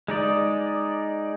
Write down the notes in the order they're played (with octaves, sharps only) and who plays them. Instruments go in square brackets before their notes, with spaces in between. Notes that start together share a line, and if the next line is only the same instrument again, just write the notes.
[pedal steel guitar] G#3 D#4 D5